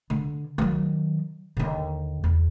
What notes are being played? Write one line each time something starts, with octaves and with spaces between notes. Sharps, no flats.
D3
D#3 F#3
D#2 D3
E2